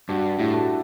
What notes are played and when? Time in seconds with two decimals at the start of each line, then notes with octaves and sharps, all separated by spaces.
0.09 G2 D4 F#4
0.38 A2 E4 G4
0.53 F#4 A4